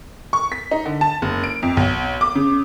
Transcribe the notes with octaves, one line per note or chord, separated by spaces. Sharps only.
C#6
B6
D#4
D3
A5
F#1
D7
F2
B1
D6
C#3